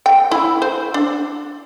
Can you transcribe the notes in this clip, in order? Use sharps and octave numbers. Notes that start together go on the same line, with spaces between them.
G5
E4
C5
D4